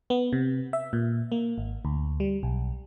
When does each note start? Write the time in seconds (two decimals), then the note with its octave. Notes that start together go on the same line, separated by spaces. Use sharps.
0.10 B3
0.33 C3
0.73 E5
0.93 A#2
1.32 A#3
1.58 G#1
1.85 D2
2.20 G3
2.43 B1